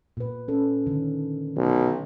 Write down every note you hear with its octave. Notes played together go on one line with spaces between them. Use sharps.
A#2 B4
C#4 A4
D3 D#3
B1 F#3